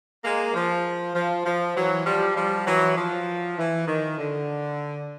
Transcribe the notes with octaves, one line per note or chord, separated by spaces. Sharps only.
G#3 A#3
F3
F3
F3
E3 F#3
F3 G3
F3 G3
E3 F#3
F3
E3
D#3
D3